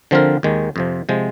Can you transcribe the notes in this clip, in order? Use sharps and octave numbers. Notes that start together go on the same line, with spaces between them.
D3 F3 C4 F4 A#4
D#2 D#3 G#3
F2 C3 F3
C3 F3 G#3